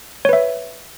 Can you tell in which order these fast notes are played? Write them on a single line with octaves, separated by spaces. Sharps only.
C#5 B4 E5